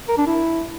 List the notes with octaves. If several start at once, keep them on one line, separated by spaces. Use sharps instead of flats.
A#4
D4
E4